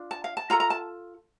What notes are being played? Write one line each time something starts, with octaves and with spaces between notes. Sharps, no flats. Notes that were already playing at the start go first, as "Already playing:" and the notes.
Already playing: D4 F4
A5
F5
A5
F4 A4 A#5
A#5
A5